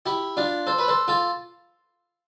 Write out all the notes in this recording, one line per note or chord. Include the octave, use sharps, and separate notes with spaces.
E4 G4
D4 F4
A4 C5
B4
A4 C5
F4 A4